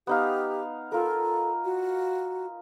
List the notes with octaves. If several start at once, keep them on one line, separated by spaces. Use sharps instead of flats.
B3 D#4 G4 F5
F4 A4 A#4
F#4